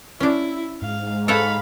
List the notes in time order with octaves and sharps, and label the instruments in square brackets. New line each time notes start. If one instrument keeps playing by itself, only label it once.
[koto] C#4 D4 [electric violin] E4
[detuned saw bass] G#2 [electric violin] F5
[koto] A4 C#5 F#5 [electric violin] F5 B5